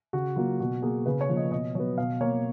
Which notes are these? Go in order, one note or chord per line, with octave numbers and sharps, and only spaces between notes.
C#3 F#4
F#3 A#3 F4
B2 F#4
A#3 G#4
C#3 B4
C#5
F3 A#3
D#5
B2 D#5
F#3 B3 C#5
B2 F5
A#3 C#5